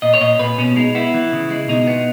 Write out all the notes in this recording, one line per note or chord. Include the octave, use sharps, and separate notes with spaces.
A#2 D#5
C#5
A#2 D#5
A#2 B4
B2 C#4
G#3 D#4
B3 E4
E3
C#3
G#3
B2 D#4
B3